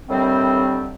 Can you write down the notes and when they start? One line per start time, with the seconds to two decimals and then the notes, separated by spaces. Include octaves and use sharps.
0.09 D#2 A2 D3 D#3 G3 C4